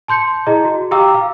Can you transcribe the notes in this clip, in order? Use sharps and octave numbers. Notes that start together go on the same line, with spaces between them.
A5 C6 G6 C#7
E4 G#4 D#5 A#5
F#4
G4 F5 G5 A#5 D6 E6
F5